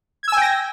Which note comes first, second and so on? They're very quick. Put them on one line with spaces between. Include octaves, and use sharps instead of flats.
G#6 E6 G#5 G5 A#6